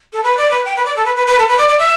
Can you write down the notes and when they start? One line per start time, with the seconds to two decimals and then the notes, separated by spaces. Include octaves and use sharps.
0.13 A4
0.24 B4
0.37 D5
0.51 B4
0.65 G5
0.76 B4
0.85 D5
0.96 A4
1.06 B4
1.16 B4
1.27 B4
1.39 A4
1.48 B4
1.58 D5
1.68 D5
1.79 E5